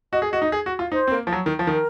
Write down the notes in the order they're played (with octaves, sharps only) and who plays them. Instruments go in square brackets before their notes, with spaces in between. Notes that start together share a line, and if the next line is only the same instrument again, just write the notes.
[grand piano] F#4 [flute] D#5
[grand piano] G#4
[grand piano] F#4 [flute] D#5
[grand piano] D#4
G#4
F#4
F4
[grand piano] D#4 [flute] C5
[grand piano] C4
A#3
F3
F#3
D#3
F3
D#3
[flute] A#4